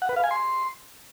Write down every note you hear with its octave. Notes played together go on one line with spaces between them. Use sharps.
F#5
B4
F5
G#5
C6